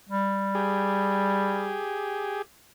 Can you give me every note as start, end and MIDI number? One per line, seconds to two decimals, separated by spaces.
0.09 1.81 55
0.55 2.42 67
0.55 2.42 68